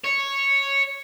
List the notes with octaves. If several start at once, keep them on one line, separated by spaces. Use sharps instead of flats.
C#5